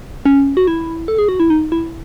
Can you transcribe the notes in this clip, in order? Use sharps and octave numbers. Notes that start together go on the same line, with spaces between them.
C#4
F#4
E4
A4
G#4
F#4
E4
D#4
E4